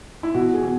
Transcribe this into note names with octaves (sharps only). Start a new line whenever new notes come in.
E4
B2 F#4
G#4
B2